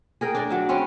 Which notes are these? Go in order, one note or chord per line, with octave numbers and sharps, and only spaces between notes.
G#4 A#4 G5
D4 D5
F#3 E5
C4 C#4 B4